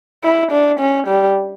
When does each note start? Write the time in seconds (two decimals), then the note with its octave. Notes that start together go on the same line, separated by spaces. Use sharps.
0.24 E4
0.52 D4
0.80 C#4
1.08 G3